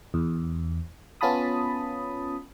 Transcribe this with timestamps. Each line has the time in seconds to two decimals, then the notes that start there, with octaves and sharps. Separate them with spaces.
0.14 E2
1.21 B3 C#4 F4 A5 B5 D#6